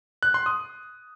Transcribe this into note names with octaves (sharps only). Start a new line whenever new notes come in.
F#6
C6
D#6